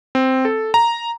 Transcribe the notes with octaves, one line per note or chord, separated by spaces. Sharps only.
C4
A4
A#5